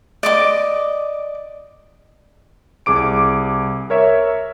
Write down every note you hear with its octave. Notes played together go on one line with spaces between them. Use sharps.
D5 D#5 D6
C2 G#4 D6 D7
A#4 C#5 E5